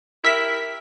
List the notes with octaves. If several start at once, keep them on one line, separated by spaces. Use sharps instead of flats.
E4 G4 A#4 E5 B6